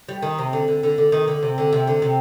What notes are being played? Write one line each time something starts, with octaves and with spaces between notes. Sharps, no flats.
G3
D#3
C3
D3
D3
D3
D3
D#3
D3
C3
D3
C3
D3
C3